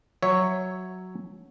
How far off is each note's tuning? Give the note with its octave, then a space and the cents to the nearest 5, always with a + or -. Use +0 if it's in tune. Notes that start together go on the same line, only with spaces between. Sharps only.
F#3 +0 C#5 +0 E5 -5